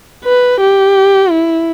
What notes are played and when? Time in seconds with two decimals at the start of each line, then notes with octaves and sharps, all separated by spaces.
0.24 B4
0.60 G4
1.30 E4